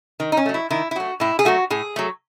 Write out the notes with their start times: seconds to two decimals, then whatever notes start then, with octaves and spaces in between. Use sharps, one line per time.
0.20 D#3
0.32 D#4
0.37 C#4
0.46 F#3 A3
0.54 E4
0.70 D#3 E4
0.91 E4
0.95 F#3 A3 F#4
1.20 A2 E4
1.39 G#4
1.45 F#3 A3 F#4
1.70 A2 G#4
1.96 F#3 A3